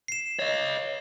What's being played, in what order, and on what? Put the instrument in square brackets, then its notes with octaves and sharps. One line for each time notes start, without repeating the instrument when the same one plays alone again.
[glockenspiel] C7 E7
[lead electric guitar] C#5 D#5